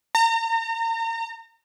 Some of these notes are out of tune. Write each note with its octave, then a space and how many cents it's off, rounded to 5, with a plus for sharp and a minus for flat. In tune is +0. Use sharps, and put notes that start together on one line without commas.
A#5 -35